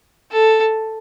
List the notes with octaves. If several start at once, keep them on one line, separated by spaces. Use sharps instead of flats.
A4